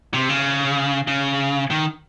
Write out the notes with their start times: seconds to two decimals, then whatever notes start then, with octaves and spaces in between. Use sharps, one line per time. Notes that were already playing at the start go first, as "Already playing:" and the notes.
0.14 C3
0.29 C#3
1.07 C#3
1.70 D#3